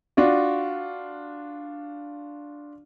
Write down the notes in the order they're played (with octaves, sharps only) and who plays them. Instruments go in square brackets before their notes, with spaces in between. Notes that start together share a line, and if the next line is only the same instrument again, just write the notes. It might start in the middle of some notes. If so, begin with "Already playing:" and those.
[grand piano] D4 F4 F#4